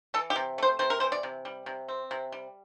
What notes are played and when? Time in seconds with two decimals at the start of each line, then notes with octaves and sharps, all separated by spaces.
0.14 E3 A4
0.30 G4
0.36 C3
0.58 A3 C5
0.79 C3 C5
0.90 A#4
1.00 E3 C5
1.12 D5
1.23 C3
1.45 G3
1.66 C3
1.88 C4
2.11 C3
2.32 G3